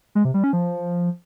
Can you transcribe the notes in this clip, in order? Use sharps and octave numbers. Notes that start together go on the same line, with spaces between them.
G#3
C3
G3
C#4
F3